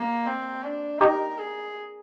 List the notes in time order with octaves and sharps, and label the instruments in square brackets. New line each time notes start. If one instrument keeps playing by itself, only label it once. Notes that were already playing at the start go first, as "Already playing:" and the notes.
Already playing: [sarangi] A#3
C4
D4
[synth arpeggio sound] D#4 G4 [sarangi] A#4
[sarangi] G#4